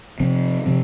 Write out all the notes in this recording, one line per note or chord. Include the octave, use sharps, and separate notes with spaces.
C3 F3 C4
C3 F3 C4